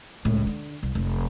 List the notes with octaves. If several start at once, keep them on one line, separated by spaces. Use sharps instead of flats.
C#2 A2
D3
C2
F1